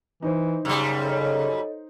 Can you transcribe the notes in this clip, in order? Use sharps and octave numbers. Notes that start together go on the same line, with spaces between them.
E3 D#4 C5
F#2 C#3 G3
A4 C#5 D#5